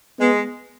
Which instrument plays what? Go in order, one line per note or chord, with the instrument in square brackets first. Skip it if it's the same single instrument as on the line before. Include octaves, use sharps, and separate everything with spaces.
[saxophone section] G#3 [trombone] B3